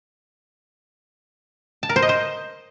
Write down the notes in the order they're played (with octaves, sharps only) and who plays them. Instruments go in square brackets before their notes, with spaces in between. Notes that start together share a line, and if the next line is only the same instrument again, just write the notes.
[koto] A5
A#4
C5
D#5
C5